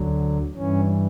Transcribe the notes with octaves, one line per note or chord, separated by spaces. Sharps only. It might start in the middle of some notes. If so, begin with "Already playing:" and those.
Already playing: D2 D3 F#3
G2 E3 C#4